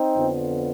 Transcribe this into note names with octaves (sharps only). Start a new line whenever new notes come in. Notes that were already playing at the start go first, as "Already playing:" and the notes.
Already playing: C4 D#4
F2 D3 F3 B3